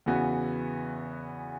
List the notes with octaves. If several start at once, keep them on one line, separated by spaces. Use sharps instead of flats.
E2 C#3 E3 B3 F#4